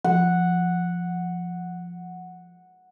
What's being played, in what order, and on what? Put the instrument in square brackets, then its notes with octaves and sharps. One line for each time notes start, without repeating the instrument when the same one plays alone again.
[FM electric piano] F3 [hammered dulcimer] F#5